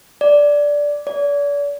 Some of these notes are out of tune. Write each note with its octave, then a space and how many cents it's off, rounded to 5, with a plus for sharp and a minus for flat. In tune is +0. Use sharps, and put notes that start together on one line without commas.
D5 -5
D5 -40